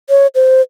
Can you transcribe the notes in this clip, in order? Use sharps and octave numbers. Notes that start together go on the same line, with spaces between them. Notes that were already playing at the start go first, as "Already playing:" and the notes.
C#5
C5